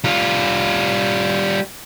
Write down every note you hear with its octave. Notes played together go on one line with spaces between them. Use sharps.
G3 F4